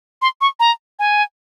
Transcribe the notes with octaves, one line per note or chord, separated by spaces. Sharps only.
C6
C#6
A#5
G#5